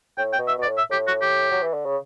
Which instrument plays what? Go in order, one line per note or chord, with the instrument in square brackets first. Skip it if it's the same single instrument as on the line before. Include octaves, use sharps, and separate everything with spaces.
[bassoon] A2 [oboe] G5
[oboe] G5
[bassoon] B2
[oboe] E5
[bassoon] B2 [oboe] D5
[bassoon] A2
[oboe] E5
[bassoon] A2 [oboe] G4
[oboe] F#4
G4
[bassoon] F#3
E3
D3
C#3